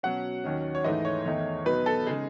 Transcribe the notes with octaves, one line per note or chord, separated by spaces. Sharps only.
B2 F#3 C#4 F#5
D#2 D#3 F#3 C#4
C#5
G#2 E3 A3 D#4 D#5
C#5
E2 D#3 A3 D#4
B2 F#3 B3 D#4 B4
A4
C#3 G#3 D#4 G#4